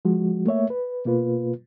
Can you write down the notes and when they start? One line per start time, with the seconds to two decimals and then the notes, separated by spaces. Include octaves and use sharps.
0.05 F3 G#3 F#4
0.46 A3 A#3 C#5 E5
0.70 B4
1.05 B2 A#3 F4 B4